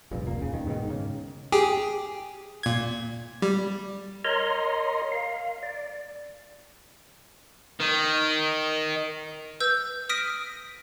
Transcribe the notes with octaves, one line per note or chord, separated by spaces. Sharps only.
F1 A#1 G2 A#2
F1 C#2 A#3
D#1 C#3
D#3
G#2 B2 D3 D#3
G#2 C#3
G4 G#4
A#2 G#6
G3
A#4 C#5 D#5 A#5 C6
F5
D5
D#3
B4 E6 G6
D#6 F6 A#6 B6 D7 D#7